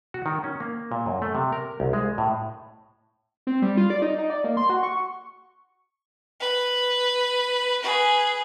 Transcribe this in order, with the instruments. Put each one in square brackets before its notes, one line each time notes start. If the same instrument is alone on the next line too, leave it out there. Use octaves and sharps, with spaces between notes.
[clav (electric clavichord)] F#4
D#3
C#4
A#3
A#2
F#2
A3
C3
A#4
C2
G#3
A2
[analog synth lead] C4
G3
F4
D5
D#4
D#4
D5
A#3
C6
F#4
C#6
[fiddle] B4
G#4 B4